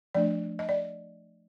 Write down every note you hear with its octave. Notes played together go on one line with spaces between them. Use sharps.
F3 A3 D4 D5
D#5
D5